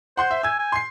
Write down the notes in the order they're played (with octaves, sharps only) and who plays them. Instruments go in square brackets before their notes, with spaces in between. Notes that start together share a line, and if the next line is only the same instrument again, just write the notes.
[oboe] C5 [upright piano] F#5 C6 G6
[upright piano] E5
[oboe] G#5 [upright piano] E6 G#6
[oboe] G#5
[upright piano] C6 C7